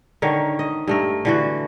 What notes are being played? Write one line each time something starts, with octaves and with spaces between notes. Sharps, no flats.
D3 D#3 A#4 C#5
D#5
G2 A3 A#4
D3 E3 F#4